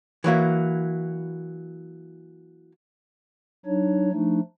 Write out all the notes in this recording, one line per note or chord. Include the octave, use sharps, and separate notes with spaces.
E3 F#3 A#3 E4
F#3 D4 D#4 C#5
F3 A3 D4 D#4